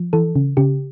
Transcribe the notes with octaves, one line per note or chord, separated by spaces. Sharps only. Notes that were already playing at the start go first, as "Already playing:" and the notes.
Already playing: F3
E3 A4
C#3
C#3 G4